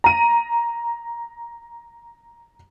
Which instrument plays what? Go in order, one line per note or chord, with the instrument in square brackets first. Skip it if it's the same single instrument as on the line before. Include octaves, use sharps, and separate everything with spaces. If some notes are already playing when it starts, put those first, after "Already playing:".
[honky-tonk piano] A#5 D#7